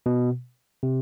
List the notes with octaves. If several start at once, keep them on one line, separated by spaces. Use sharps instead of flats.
B2
C3